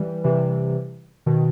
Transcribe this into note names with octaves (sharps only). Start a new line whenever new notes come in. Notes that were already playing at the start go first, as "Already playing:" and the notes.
Already playing: E3 G3
C3 E3
B2 D#3